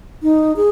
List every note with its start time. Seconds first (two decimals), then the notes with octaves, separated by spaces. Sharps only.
0.23 D#4
0.56 G#4